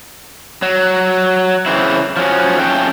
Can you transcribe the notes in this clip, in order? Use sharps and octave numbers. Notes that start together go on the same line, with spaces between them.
F#3
C#3 E3 C4 E4
F3 F#3 C#4
F2 A3 C#4 G5